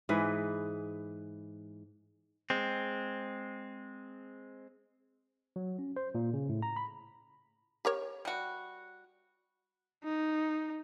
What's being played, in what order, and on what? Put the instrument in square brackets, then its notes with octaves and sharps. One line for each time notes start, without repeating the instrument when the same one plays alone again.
[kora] G#2 E3 G#4 B4
[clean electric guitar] G#3 C4
[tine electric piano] F#3
C#4
C5
A#2
C#3
A2
A#5
B5
[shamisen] G4 A#4 C#5
[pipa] G3 F#4
[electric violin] D#4